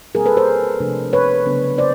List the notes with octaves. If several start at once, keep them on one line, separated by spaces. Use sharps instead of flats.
B2 G3 C4 G#4 A#4
A4 B4
A#4 C5
C3 F3 A3 D4
B4 C#5
C#3 F#3 B3 D4
C5 D5